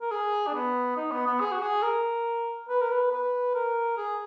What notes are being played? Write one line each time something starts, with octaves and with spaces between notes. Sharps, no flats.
A#4
G#4
D4
B3
D#4
B3
B3
G#4
F#4
G#4
A#4
B4
A#4
B4
B4
A#4
G#4